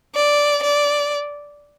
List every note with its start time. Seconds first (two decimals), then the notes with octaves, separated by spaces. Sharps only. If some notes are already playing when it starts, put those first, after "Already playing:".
0.15 D5
0.63 D5